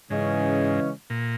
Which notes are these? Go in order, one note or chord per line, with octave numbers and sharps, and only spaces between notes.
G#2 C#3 E3 G#3 C#4
A#2